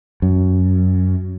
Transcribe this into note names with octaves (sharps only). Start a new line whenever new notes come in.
F#2